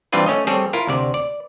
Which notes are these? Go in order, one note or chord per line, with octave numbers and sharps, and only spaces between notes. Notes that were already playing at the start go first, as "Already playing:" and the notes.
E3 G3 C4 D4 F4 B4
A3 C#4 C#5 D#5
G3 C4 G#4 A4 C#5 D5
E4 F4 A#4
D2 C3 D5
D5